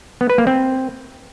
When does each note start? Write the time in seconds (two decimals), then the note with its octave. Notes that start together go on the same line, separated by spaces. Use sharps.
0.21 B3
0.30 B4
0.38 A#3
0.47 C4